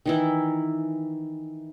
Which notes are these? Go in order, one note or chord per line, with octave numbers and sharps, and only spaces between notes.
D#3 E3 E4